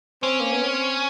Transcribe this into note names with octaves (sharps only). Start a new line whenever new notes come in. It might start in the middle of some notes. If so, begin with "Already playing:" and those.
C4 C#4
A#3
B3
C4